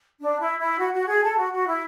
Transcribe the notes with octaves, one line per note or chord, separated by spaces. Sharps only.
D4
E4
E4
F#4
F#4
G#4
A4
F#4
F#4
E4